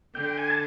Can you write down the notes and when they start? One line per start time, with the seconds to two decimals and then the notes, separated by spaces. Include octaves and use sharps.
0.15 D3 G5
0.38 G#5
0.50 A5